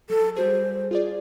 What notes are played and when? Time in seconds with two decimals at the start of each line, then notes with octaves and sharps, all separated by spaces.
0.10 F#3 A4
0.36 G3 F#4 G#4 C5
0.91 F4 G#4 D5